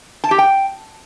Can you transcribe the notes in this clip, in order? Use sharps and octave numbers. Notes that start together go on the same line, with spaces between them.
A5
G4
G5